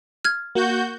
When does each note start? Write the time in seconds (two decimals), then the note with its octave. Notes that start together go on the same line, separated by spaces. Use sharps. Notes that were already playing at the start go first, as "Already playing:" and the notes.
0.25 F6 G#6
0.55 A#3 F#4 G6